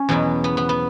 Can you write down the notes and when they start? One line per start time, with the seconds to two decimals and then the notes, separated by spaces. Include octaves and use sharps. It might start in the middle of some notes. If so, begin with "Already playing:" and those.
Already playing: C#4
0.09 E2 B2 F#3 B3
0.44 B3
0.57 B3
0.69 B3